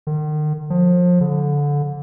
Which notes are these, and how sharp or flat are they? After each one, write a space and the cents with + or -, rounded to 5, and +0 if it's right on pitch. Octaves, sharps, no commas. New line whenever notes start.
D#3 -40
F3 +30
D3 -20